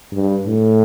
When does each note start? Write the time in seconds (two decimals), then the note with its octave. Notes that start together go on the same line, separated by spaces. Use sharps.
0.13 G2
0.46 A2